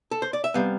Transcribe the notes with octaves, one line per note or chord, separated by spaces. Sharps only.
A4
C5
D5
E5
C3 G3 B3 F5